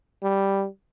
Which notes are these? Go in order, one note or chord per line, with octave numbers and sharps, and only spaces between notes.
G3